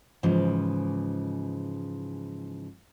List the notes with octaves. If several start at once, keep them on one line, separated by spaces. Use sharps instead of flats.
G#2 C#3 E3 F3